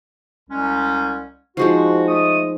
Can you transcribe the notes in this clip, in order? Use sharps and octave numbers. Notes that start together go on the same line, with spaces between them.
C2 G#3 C#4
F3 G#3 D#4 F#4
A3 D#5 D#6